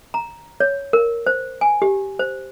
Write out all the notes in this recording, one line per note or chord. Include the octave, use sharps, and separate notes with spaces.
A#5
C#5
A#4
C5
G#5
G4
C5